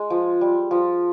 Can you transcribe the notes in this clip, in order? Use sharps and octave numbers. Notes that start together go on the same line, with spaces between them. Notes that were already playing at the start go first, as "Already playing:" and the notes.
Already playing: G#3
F3
G3
F3